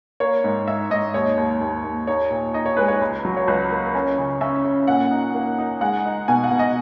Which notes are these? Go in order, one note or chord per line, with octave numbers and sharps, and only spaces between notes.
A#3 C#5
G#2
G#2 E5
G#2 D#5
D#2 C#5
D#2
D#2
D#2
D#4 C#5
A#2
D#4 D#5
C#5
G#3 B4
C#5
C#2
F#3
C#5
C#2 B4
A#3
C#4 C#5
C#3
C#4 E5
C#4
A#2 F#5
D#4
A#3
D#4
G#3 F#5
D#4
B2 G#5
F#5
B2
D#5